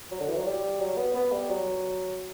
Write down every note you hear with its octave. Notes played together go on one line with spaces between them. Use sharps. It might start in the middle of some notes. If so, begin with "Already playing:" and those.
F#3
D3
E3
F#3
G3
F#3
B3
B3
G3
F#3